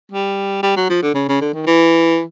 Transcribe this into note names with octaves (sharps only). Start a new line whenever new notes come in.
G3
G3
F#3
F3
D3
C#3
C#3
D3
D#3
E3